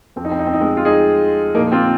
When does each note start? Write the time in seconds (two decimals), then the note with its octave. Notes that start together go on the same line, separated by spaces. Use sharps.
0.16 F2 F3 C4
0.25 D#4
0.32 C4
0.39 D#4
0.47 C4
0.54 D#4
0.61 G#3 C4
0.77 F4
0.85 D#4 G#4
1.54 F3 A#3 D#4
1.57 A#2
1.72 C4 F4